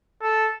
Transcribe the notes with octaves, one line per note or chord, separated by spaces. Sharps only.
A4